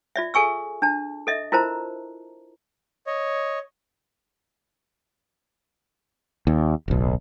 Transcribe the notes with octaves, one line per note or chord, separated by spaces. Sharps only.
F4 D5 E5
G#4 A4 G#5 C#6 E6
D4 A5
A4 D#5 E5
E4 F4 A#4 C5 A5 A#5
C#5 D#5
D#2
D1 B1